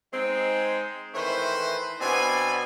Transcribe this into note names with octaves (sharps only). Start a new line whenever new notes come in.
G#3 C4 D#4
D#3 E3 A3 B4 C5
B2 B3 C4 D4 D5 G#5